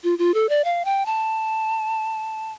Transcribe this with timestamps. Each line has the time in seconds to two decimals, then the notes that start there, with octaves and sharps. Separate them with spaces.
0.04 F4
0.19 F4
0.34 A4
0.49 D5
0.64 F5
0.85 G5
1.06 A5